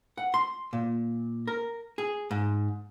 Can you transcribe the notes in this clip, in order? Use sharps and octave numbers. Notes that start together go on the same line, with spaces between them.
F#5
C6
A#2
A#4
G#4
G#2